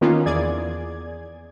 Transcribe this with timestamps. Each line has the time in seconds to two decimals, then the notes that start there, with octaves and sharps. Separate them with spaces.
0.01 D#3 A#3 B3 C#4 F4
0.26 E2 G#4 D5 G#6